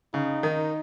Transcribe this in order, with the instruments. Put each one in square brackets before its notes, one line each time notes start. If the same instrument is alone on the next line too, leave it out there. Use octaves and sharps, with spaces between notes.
[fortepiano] C#3 [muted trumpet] D#4
[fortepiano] D#3